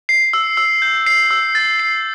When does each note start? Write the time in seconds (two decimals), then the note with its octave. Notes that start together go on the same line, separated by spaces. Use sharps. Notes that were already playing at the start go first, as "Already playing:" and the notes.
0.09 C7
0.33 E6
0.57 E6
0.82 G6
1.06 C7
1.31 E6
1.55 A6
1.79 C7